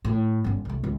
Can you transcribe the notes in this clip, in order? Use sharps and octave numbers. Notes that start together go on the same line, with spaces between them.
A2
G1 C#4
C2 A3
C#2